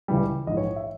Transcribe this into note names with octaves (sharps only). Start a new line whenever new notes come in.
C#2 C#3 E3 G3
A#1 G#2 E3 D#5
C#5
E5